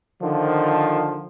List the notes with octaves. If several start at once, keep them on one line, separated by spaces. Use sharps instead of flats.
D3 D#3 F3